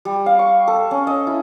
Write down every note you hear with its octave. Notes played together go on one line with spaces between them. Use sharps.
G3
F5
C#6
A4
C#4
D#5
E4